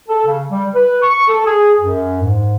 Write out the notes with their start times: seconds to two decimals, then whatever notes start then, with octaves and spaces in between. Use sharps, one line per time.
0.09 A4
0.26 C#3
0.50 G3
0.74 B4
1.02 C#6
1.28 A4
1.46 G#4
1.80 F#2
2.22 G#2